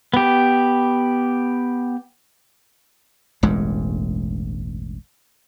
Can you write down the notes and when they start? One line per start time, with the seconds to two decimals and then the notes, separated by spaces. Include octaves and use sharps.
0.14 B3 G4
3.43 E1 A1 G2 G#3